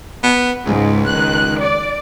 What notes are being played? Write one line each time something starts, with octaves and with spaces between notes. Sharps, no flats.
B3
C#2 G#2
D#3 F#6
D5